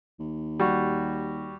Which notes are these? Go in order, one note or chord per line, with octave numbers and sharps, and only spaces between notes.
D#2
G3 F#4